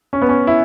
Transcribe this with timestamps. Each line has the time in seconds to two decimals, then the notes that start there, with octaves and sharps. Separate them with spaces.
0.13 C#4
0.22 B3
0.29 C#4
0.47 E4